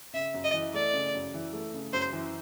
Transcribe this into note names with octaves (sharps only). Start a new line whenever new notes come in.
C#3 E5
F#2
D#5
E3
A3 D5
C#3
F#2
E3
A3
C#3
F#2 C5
E3